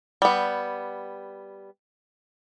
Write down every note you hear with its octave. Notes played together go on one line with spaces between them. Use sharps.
G3 B3